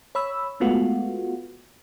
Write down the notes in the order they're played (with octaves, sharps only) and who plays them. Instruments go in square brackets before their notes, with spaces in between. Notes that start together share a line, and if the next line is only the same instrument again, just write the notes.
[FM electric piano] C#5 B5 E6
G#3 A3 B3 F4 F#4